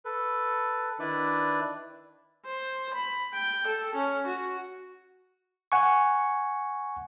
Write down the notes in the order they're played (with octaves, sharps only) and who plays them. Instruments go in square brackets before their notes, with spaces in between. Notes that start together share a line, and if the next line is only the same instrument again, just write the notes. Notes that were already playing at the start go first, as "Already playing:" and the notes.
[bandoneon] A4 B4
D#3 D4 E4 B4 D5
[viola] C5
B5
G5
A4
C#4
F#4
[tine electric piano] F#5 G#5 C#6